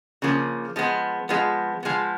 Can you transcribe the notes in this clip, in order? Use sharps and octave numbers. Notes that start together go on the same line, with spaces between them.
C#3 F3 A#3
F3 G#3 B3
F3 G#3 B3
F3 G#3 B3